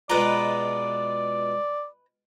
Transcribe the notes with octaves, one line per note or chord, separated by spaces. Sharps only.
B2 G#3 F4 B4 D5 A#5